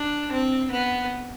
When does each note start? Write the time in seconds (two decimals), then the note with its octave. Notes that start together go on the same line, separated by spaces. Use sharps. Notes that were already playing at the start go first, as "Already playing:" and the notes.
Already playing: D4
0.31 C4
0.71 B3